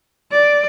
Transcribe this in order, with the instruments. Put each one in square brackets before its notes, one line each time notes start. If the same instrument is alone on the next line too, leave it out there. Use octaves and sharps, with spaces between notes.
[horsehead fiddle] D5